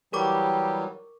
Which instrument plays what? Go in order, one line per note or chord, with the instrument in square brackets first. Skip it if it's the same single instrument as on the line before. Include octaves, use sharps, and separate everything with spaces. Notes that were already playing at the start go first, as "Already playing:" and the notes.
[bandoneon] E3 F#3 G3 [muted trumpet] G4 [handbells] A#4 C#6 D6